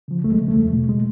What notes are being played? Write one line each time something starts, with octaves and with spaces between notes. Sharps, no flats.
C#3 F3
D2 A3
G#3
C#3 F3
A3
E2
B2
G#3